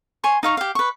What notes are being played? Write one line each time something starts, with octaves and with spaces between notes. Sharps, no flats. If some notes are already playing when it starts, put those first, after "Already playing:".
G#5 C6 C#6
D#4 F5 C#6
G4 F5
B4 C#6